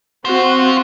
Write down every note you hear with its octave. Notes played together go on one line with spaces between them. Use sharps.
C4 F4 F#4 C5